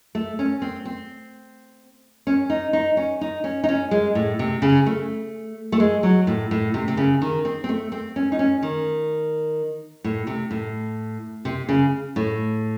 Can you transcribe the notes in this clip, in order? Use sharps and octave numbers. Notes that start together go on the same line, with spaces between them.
A3
C#4
C4
C4
C#4
D#4
D#4
C#4
D#4
C#4
D#4
C#4
G#3
A2
C3
C#3
A3
A3
G#3
F#3
A2
A2
C3
C3
C#3
D#3
C4
C4
A3
C4
C#4
D#4
C#4
D#3
A2
C3
A2
C3
C#3
A2